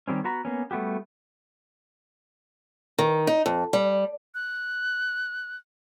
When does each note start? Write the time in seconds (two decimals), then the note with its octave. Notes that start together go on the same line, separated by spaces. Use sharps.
0.08 D#3 G3 C4 C#4
0.24 B3 F#4 A#5 B5
0.45 A#3 B3 C#4
0.71 G3 A3 B3 F#4 G4
2.98 D#3
3.27 D#4
3.46 F2
3.73 G3
4.35 F#6